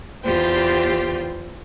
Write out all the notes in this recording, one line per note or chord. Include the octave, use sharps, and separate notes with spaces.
E2 F4 G4 C5 G5